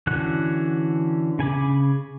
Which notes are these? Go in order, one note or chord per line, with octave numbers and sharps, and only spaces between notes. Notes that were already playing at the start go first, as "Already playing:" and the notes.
D3 E3 C#4 F#4 F#6
C#3 G#5 B5 D6